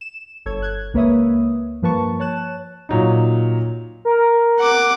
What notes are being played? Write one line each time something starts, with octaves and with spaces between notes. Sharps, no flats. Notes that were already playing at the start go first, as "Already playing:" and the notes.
E7
G1 A4 C#5 G#6
F#6 G#6
C#2 A#3 B4 C#5 E5 D#6
G2 F3 A#3 B4 A5 C#6
C#5 A5 F#6 E7
A#2 F#3 D#4
A#4
F#5 D6